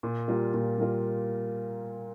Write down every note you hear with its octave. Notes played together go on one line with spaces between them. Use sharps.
A#2
G3 A#3 F4 A#4
A#2
G3 A#3 F4 A#4